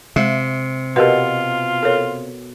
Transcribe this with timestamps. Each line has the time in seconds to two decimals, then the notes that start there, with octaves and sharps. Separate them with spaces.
0.16 C3 G#3 E5
0.96 B2 F4 G4 A#4 B4
1.83 A4 A#4 C#5